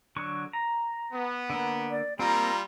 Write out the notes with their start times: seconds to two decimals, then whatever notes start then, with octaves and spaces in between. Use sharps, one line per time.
0.16 D3 F#3 C#6
0.53 A#5
1.12 B3
1.50 D3 A#3
1.91 D5
2.19 G3 A#3 C4 F4 A#5